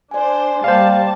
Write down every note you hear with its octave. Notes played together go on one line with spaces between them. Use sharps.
D4 C5 D5 G#5
G3 A#3 C5 D5 F5 G5 A5